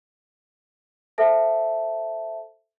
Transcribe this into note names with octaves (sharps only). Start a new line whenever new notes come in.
A4 C5 E5 A5